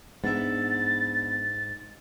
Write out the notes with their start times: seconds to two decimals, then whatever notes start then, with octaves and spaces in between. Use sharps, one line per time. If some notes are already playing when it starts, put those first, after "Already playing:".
0.24 G#2 B3 D4 E5 A6